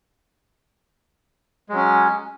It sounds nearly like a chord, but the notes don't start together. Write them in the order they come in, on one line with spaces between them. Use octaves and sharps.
G#3 F#3 C#4